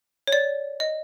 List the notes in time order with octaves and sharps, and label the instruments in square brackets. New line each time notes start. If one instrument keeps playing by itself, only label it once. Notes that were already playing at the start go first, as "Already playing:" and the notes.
[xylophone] C#5
D5
D#5